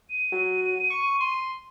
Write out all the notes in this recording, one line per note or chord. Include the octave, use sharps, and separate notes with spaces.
D#7
F#3
C#6
C6